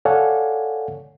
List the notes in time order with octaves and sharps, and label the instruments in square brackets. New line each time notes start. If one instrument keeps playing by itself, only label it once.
[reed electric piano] A4 C#5 D5 F5 F#5 G#5